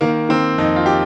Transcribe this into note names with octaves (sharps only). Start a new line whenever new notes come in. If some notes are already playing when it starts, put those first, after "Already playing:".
D#3 A#3
D#3 C4
F2 D#4
F4
G4